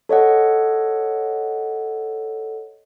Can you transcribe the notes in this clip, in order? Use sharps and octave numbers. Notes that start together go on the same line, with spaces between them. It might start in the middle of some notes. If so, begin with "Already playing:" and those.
A4 C#5 D#5 F#5